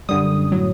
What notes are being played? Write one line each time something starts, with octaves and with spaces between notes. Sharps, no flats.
F#2 D3 G3 D#6
A2 F#3